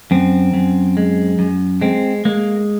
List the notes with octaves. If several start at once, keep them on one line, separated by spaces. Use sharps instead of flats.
F#2 C4
F#2
G#3
F#2
G#3 C4
G#3 A#3